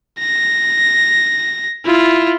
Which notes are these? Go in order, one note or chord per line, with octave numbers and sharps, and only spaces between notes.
A#6
E4 F4